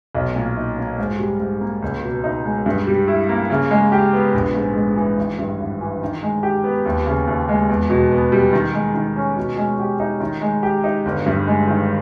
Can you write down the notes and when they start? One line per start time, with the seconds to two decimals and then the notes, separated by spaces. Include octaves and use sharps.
0.15 B1
0.36 A#2
0.57 D#4
0.78 A#3
0.98 G#2
1.19 G3
1.40 G#2
1.61 A#3
1.82 C#2
2.04 B2
2.24 D#4
2.45 G#3
2.66 G2
2.87 G3
3.08 E4
3.29 A#3
3.50 C#3
3.71 G#3
3.92 G4
4.13 B3
4.34 A#1
4.55 G#2
4.76 G#3
4.97 E3
5.17 G#1
5.39 G2
5.60 G#1
5.81 E3
6.02 D#3
6.23 G#3
6.43 G4
6.64 B3
6.86 D#2
7.07 C#3
7.28 D#2
7.49 G#3
7.69 E2
7.90 B2
8.11 B3
8.32 G3
8.53 D#3
8.74 G#3
8.95 D#3
9.16 C#4
9.37 B2
9.57 G#3
9.80 G4
10.00 D#4
10.20 D#3
10.42 G#3
10.63 G4
10.84 D#4
11.05 G1
11.26 G2
11.47 G#3
11.68 D#3